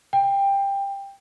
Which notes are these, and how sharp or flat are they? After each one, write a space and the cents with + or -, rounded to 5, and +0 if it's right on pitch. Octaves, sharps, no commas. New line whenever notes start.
G5 +15